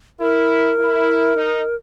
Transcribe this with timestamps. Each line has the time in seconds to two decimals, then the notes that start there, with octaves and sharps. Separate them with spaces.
0.20 E4 A#4
0.78 E4
1.36 D#4